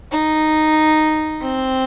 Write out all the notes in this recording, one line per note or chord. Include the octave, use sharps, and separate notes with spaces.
D#4
C4